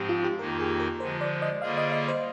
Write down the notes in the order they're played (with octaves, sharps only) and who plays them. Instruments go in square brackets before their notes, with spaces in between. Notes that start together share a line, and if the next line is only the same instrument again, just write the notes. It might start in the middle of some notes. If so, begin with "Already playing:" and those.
Already playing: [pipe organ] G#2 F3 G#3 C4 [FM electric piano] G4
[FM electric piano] F4
G4
[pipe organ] F2 D#3 A#3 D#4 [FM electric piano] A#4
[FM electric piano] G#4
A#4
[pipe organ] D3 F3 G#3 [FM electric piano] C5
[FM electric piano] D5
D#5
[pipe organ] D3 G3 A#3 F4 G#4 [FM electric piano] F5
[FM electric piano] D#5
D#5
C5